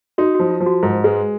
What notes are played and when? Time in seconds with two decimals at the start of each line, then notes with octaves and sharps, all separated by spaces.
0.18 D#4 F#4
0.35 F#4
0.40 F3
0.50 F4
0.61 F3
0.66 F#4
0.83 G#2 A#4
1.04 G#3 B4